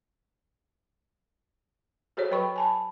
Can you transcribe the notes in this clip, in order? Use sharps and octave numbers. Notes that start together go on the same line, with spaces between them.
F#4 G#4 A4 C5 C#5
F#3 B4 G5 B5 C#6
G#5 A5 B5